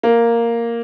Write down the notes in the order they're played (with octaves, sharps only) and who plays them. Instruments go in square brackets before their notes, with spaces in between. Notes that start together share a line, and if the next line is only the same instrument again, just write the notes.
[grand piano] A#3